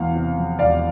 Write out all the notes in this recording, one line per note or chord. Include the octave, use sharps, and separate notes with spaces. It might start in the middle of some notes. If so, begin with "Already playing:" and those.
Already playing: E1 E2 F5
C3
F3
E1 D5 F5